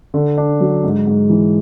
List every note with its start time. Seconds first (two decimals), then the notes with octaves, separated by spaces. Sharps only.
0.14 D3
0.37 D4
0.60 F#3
0.84 G#2
1.07 G#2
1.30 E3